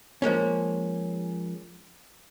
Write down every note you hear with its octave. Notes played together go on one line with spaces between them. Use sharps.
F3 G#3 A#3 C#4